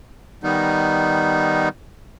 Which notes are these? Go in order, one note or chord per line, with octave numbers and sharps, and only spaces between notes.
D#3 G3 B3 D#4